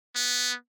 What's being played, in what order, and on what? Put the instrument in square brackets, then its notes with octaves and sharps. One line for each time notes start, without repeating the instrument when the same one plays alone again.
[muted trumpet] B3